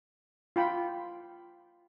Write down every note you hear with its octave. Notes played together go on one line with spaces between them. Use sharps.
F4 G5 B5